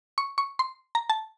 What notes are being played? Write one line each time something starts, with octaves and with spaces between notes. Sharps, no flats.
C#6
C#6
C6
A#5
A5